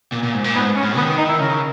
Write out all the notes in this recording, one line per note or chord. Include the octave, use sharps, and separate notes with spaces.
A#2
A#2
G#2
A#2
G#2 B3
C#4
G#2
D#3 B3
D#4
E4
C#3 A#4